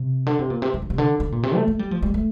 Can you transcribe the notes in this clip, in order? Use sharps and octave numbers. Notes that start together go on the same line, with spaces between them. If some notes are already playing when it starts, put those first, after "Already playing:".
Already playing: C3
D3
C3
A#2
C3
E3
D3
C3
D3
D3
A#2
C3
A3
A3
G3
F3
G3
A3